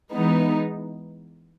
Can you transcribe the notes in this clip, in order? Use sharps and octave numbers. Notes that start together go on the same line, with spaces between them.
E3 G#3 B3 D#4